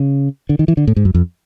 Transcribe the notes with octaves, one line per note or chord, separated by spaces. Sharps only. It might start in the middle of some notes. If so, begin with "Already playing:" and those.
Already playing: C#3
D3
D#3
E3
D3
A2
G#2
F#2
F2